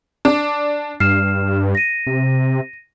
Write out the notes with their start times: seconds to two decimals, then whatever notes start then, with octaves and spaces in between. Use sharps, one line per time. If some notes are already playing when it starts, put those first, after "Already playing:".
0.25 D4 D6
1.00 G2 F6 C7 E7
1.75 A#6 D#7
2.07 C3